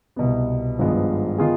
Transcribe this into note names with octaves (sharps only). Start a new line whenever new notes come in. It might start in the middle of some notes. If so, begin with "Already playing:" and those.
C2 B2 B3
G#1 G2 F3 G#3 B3
D#3 B3 F4 G#4